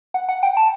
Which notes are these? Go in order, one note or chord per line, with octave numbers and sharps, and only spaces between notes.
F#5
F#5
G5
A5